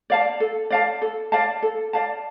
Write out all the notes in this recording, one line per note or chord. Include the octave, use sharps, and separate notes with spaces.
D5 F5 A5
A4
D5 F5 A5
A4
D5 F5 A5
A4
D5 F5 A5